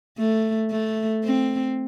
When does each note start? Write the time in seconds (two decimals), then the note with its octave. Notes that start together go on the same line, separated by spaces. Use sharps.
0.18 A3
0.71 A3
1.24 C4